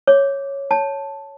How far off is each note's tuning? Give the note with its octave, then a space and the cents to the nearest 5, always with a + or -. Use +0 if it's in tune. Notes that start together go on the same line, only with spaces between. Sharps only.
C#5 -5 D6 -5
C#5 +0 A5 +0